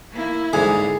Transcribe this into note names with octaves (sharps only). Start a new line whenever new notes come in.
A#3 E4
G#2 D3 G#4